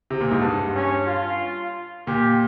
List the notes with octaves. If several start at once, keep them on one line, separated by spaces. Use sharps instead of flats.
C3
A#2
G#2
G2
C#4
F4
A#2 G4